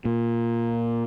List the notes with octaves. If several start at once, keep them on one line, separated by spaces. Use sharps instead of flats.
A#2